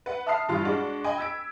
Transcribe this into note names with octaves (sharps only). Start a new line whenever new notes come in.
B4 F#5
E5 A5 D#6 F6 C7
G2 E3 F4 F6
G#3 D4 F#4
D#5 G5 G#5 B5
E6 G#6 B6 D7